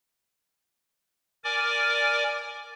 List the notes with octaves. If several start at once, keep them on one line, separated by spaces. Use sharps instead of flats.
A#4 D5 G#5 D6